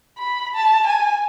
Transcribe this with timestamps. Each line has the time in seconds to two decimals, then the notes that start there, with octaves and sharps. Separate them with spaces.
0.19 B5
0.55 A5
0.87 G#5